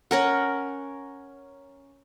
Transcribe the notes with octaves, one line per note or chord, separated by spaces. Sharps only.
C#4 A#4 F#5